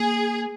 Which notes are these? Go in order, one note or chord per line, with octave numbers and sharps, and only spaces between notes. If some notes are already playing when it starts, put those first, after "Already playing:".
Already playing: A#3 G#4